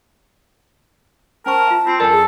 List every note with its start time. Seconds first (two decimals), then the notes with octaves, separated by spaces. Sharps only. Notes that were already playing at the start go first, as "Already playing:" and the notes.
1.46 C#4 A#4 C5 A5 C#6
1.68 F4 E5
1.87 C4 F4
2.00 F#2 A4 A#4 D5 G#5 A5
2.12 G#4